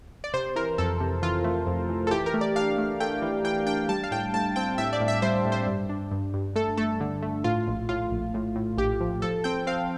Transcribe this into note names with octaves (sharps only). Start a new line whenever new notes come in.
D5
C3 C5
E3 A#4
F2 A4
C3
E3 F4
A3
F2
E3
A4
E3 G4
A#4
A3
D5
D4 F5
A3
A3 G5
E3
E3 G5
D4 G5
G3 A5
F5
A2 G5
A2 A5
C4 G5
A2 E5
D5
A2
E5
G3 C5
A2
C5
G2
D4
G2
G2
A3 A4
A3 A4
D3
A3
A2 F4
A#1
A2 F4
A#1
A2
A2
A#1 G4
F3
F3 A4
C4 G5
C4 F5